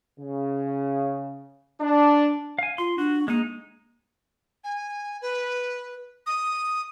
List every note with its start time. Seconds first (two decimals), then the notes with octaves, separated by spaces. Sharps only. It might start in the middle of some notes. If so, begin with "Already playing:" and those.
0.19 C#3
1.80 D4
2.59 F5 G#5
2.78 F4 C6
2.98 D4 F#4
3.28 G#3 A#3 D#4
4.64 G#5
5.22 B4
6.26 D#6